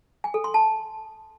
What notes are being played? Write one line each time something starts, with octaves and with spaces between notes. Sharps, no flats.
G#5
A4
C6
A5